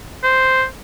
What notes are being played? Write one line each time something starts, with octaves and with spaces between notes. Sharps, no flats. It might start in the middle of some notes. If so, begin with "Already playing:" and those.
C5